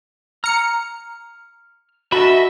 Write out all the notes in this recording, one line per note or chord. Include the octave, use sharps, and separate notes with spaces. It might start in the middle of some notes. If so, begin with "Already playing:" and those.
A#5 F6 C#7
F#4 D#5 E5 A5 B5